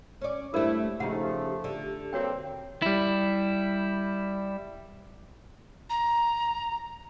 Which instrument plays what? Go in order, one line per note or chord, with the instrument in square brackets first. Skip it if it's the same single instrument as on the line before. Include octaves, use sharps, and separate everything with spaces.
[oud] C#4 D5
[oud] G2 A3 [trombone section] E4 [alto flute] G4 [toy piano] A#4 C5 D5
[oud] C#3 D#4 [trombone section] F3 A3 [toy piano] F#5
[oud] D3
[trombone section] G2 A#3 C4 [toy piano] F#4 C#5 G5
[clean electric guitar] G3 E4
[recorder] A#5